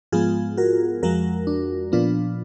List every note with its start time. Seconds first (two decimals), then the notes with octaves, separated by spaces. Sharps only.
0.12 G#2 F3 G#3 B3 F4 G#4
0.57 F#4 A#4
1.02 F2 F3 G#3 F#4 A#4
1.47 D4
1.92 A#2 F3 B3 D4 F4